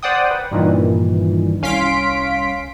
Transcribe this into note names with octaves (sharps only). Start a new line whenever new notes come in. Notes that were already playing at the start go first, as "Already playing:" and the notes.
C5 D5 F#5 G5 D#6
B4
G2 A#2 D#3 E3
C2 C#4 F5 C6 B6 D7